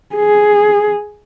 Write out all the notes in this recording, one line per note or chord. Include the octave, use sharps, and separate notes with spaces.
G#4